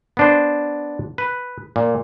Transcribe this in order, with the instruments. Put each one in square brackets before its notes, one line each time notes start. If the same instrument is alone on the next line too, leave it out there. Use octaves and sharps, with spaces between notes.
[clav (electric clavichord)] B3 D4 C5
B4
A#2